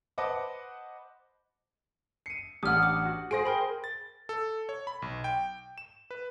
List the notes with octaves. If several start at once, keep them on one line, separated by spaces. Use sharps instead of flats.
B4 C5 D#5 F#5 A5 D6
C7 C#7 D#7
A1 D4 G4 F#5 D6 D#6 F6
D6
F#4
G#4 C5 A#6 D7
A#4 G5 B5
A6
A4
C#5
B5
B1
G5
E7
B4